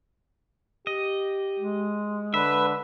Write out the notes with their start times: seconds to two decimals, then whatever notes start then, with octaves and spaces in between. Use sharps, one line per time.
0.87 G4 D#5
1.59 G#3
2.34 D3 B4 E5